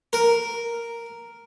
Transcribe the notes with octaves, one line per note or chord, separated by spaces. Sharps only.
A#4